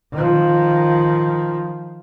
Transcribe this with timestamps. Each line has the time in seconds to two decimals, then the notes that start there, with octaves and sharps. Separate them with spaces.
0.12 D#3 F3